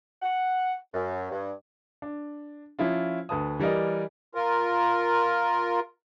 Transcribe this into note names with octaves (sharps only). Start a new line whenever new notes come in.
F#5
F#2
G2
D4
F3 C#4 E4 F4
D2 B4 A5 D#6
E3 G3 A#4 D5 D#5
F4 A#4